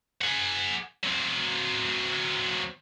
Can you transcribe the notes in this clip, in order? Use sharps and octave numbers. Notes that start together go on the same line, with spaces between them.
G#4 F#5
F#3 C4